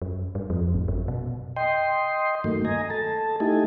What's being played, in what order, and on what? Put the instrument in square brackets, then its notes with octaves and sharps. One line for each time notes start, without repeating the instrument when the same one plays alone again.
[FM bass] F#2
G2
F2
G#1
F#2
B2
[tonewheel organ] D#5 G5 C6
G2 D#3 F#3 A3 A#3
D#5 G#5 A#5
A4 A5
A3 D#4 E4 G4 G#5